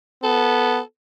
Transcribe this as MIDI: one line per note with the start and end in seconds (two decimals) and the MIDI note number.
0.24 0.81 59
0.24 0.81 69